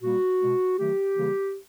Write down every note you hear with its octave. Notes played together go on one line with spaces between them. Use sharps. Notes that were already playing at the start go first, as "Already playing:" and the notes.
A#2 G3 A#3 F#4
B2 G#3
D#3 F#3 A3 G4
C#3 E3 G3 A#3